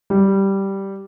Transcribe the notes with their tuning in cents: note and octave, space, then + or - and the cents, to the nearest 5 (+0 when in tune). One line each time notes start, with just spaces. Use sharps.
G3 -5